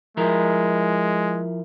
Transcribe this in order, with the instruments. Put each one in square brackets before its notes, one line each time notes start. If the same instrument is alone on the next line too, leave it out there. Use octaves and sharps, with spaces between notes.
[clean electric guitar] F3 E4 A#4 [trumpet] G#3